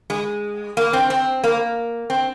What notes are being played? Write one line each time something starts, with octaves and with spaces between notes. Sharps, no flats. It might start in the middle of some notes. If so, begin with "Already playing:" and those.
G#3
A#3
C4
C4
A#3
C4